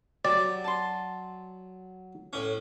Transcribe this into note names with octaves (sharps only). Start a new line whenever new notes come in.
F#3 G4 D5
A5 C6
A2 C#4